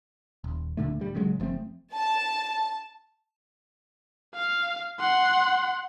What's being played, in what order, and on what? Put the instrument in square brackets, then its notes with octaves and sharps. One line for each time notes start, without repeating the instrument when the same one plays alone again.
[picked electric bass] D#1
D1 A#2 D3 A3
D2 G3
A1 C#3 F#3 G#3
F#1 F3 A3 C4
[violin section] A5
[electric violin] F5
F#5 C6